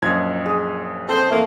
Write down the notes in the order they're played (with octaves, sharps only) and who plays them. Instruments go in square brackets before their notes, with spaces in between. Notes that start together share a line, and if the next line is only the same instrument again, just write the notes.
[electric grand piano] A#1 F#2 G#6 [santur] F3 D#5
[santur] G#4
[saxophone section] C4 C5 [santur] A4
[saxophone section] F2 E3 A#3 [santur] A3